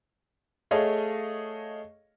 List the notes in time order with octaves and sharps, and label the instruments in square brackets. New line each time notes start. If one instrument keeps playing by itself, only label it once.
[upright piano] A3 G#4 C#5 D#5 F5 A5